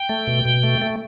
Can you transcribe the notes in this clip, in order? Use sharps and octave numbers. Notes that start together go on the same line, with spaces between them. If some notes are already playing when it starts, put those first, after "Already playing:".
Already playing: G5
A3
B2
B2
A3
A3